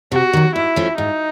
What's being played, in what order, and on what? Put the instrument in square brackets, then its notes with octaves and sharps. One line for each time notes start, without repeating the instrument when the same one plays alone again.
[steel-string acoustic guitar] C3 [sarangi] F#4
[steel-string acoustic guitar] D#3 F#3
[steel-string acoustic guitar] G#2 [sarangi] E4
[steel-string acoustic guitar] F3 A3 C#4
[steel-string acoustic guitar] G#2 [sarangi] D#4